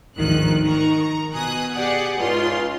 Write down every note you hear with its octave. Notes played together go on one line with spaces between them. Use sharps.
G#1 D2 D#3 F3 F#6
D#3 A#5 C#6
A#5
B2 G#5 D#6 F#6
G4 G#4 D5 F#5 G#5
C#2 G#2 F4 C6